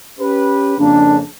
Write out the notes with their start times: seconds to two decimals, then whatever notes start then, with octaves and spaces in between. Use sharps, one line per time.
0.20 C#4 G4 B4
0.78 F2 C#3 A#3 D4